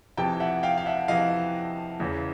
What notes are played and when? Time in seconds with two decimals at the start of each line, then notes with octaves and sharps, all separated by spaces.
0.17 F2 C3 E3 G5 A5
0.40 E5 F#5
0.63 F5 G5
0.77 F5
0.86 E5 F#5
1.08 F2 C3 E3 D#5 F5
2.00 E2 C#3 E3